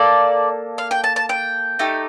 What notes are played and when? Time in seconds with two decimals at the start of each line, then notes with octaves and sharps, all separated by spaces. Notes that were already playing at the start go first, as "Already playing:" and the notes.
Already playing: A#3 A4 D5
0.78 F5
0.91 G5
1.04 A5
1.16 A5
1.29 G5
1.79 A3 D#4 G4